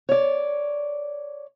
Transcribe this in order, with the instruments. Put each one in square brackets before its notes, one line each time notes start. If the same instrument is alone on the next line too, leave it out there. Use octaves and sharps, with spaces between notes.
[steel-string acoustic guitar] C#5 D5